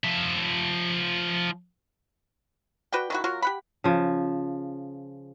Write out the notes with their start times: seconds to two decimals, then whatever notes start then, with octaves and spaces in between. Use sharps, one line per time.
0.04 F3 E5
2.92 F#4 B4 D5 G5
3.10 D#3 E4 F#4
3.24 F#3 F4 F#4 A#4
3.42 G4 F#5 B5
3.84 C#3 F3